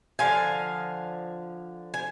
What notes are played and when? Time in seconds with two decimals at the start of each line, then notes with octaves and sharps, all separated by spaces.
0.19 D3 F3 F5 G#5
1.94 G#5